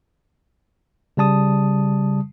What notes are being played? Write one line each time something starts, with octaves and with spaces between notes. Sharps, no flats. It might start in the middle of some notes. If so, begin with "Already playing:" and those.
C#3 G3 A5 D#6